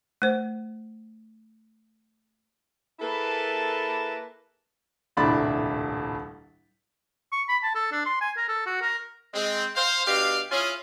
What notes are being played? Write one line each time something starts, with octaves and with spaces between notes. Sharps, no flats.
A3 C5
A#3 E4 G#4 A4 B4 A5
D#1 C2 A2 D4 B5 A6
C#6
B5
A5
A4
D4
C6
G#5
A#4
A4
F#4
A#4
G#3 C4
C5 F5
B2 D4 G4 F5
C#4 E4 F4 G#4 F5 G#5